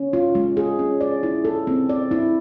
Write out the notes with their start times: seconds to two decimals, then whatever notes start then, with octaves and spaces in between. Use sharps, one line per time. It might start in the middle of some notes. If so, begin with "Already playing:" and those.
Already playing: C#4
0.13 F4
0.35 G#3
0.57 G#4
0.79 C#4
1.01 D5
1.23 E4
1.45 A4
1.67 C4
1.89 D5
2.11 E4